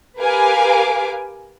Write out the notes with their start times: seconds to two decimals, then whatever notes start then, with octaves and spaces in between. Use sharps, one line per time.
0.19 G4 A#4 B4 F5 G#5 D6